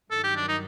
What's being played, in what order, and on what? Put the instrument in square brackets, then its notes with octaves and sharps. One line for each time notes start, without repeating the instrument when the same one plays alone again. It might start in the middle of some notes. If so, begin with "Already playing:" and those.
[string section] G2 D#3 F#3 [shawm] A4
[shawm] G4
D4
D#4